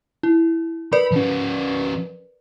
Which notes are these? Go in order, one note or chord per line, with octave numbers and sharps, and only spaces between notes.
E4
A#4 B4 D5 B5
F3 C#4